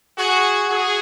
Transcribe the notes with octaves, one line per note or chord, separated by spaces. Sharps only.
F#4 G#4
F#4 G#4